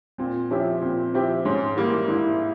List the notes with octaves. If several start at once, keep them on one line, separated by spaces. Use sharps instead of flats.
A#2 C4
F3 C4 C#4 E4 G4
A#2 C4
F3 C4 E4 G4
G#2 C#4
E3 G3 A#3
G#2 E4